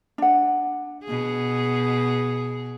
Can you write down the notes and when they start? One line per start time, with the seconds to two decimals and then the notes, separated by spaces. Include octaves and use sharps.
0.18 D4 F#5
1.04 B2 G#4